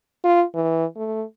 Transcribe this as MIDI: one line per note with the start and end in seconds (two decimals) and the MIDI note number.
0.24 0.44 65
0.55 0.85 52
0.96 1.24 57